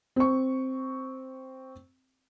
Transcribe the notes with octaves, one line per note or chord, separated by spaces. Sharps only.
C4 C#6